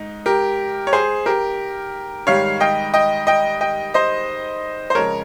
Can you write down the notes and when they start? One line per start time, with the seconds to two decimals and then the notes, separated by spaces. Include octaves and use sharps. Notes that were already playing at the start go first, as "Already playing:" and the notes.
Already playing: G#2 D#4
0.26 G4 A#4
0.87 C#5
0.93 G#4 C5
1.26 G4 A#4
2.27 G#2 D#3 G3 C#5 F5
2.60 D#5 G5
2.94 D#5 G5
3.27 D#5 G5
3.61 D#5 G5
3.94 C5 D#5
4.90 C5
4.95 F2 C#3 G#3 A#4 C#5